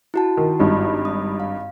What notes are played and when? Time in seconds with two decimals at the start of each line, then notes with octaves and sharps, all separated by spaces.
0.14 E4 F#4 A5
0.37 D#3
0.59 G#1 G2 D#4
1.05 D#6
1.40 F5